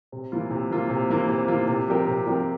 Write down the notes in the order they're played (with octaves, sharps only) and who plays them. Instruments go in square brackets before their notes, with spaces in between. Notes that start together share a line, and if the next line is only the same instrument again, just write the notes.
[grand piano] C3
E3 A#3 F4
C3
E3 A#3 F4
C3
E3 A#3 F4
C3
E3 A#3 F4
C3
F3 C4 G4 A#4
C3
F3 C4 G4 A#4